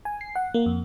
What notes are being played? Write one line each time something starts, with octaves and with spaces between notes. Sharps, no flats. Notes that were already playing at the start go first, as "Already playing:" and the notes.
G#5
C7
F#5
A#3
F2